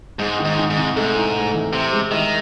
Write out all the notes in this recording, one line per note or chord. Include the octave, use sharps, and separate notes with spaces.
G#2 G#3
D#3
G#2
D#3
G#2
C2
G#2 A3
A2
A3
E3
C3 E4
G#3
D#3 E4